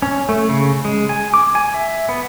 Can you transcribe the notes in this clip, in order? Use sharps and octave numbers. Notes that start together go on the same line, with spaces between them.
C#4
A3
C#3
G#3
G#5
D6
G#5
E5
B3